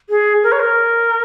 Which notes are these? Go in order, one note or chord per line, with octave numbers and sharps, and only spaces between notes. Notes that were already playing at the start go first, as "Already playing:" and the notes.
G#4
A#4
C#5
A#4